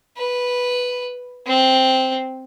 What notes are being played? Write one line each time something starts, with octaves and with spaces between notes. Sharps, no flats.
B4
C4